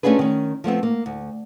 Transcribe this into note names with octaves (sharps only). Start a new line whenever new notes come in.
A3 C#4 D4 F4 G#4 B4
D#3 C#4
F3 A3 B3 C4
A#3
D2